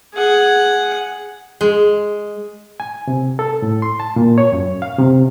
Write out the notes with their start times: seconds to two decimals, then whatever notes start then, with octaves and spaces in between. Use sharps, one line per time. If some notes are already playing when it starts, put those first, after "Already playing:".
0.14 G#4 F#5
1.61 G#3
2.80 G#5
3.07 C3
3.39 A4
3.62 A2
3.82 C6
4.00 A5
4.16 A#2
4.38 C#5
4.52 F#2
4.82 F5
4.98 C3